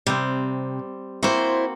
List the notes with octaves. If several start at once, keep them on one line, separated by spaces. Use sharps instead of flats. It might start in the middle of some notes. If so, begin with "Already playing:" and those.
C3 G3 C4
A#3 C4 E4 F#4 C5